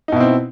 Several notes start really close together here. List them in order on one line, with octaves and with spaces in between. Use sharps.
D#4 B2 E4 C4